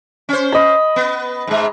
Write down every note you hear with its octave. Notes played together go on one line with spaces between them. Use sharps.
C#4 C5
D#5 B5
B3
G#2 G#3